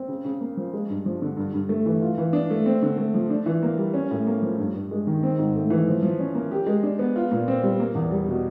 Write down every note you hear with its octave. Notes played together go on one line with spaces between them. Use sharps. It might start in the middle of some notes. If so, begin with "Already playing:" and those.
Already playing: C4
C#3
C#3
A#3
F3
G#3
G2
F3
D3
G2
G2
A3
E3
F4
E3
D4
A3
C4
D3
A3
F3
D4
E3
A#3
G3
C#4
A2
A#3
F3
G2
G2
G#3
D#3
C4
G#2
A3
E3
F3
F3
C#4
A#3
G4
G#3
D4
B3
F4
A#2
C4
G3
A#3
E2
G3
B2